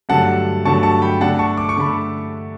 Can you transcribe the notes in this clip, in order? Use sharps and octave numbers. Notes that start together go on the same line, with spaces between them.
G2 D3 F#3 A3 F#5 A5
G2 D3 F#3 A3 A5 C#6
A5 C#6
G5 B5
D3 A3 D4 F#5 A5
A5 C#6
D6
C#6
D3 A3 B5